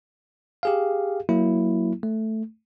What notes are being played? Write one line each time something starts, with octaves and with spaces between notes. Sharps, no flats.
G4 G#4 F5
F#3 A#3 E4
A3